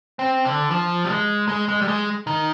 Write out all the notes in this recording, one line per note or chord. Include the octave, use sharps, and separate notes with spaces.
C4
D3
F3
G3
G#3
G#3
G#3
G3
G#3
D#3